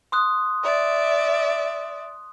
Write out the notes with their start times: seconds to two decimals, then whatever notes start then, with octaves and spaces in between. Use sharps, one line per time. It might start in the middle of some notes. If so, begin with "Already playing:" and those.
0.12 C6 D#6 F#6
0.63 D5 E5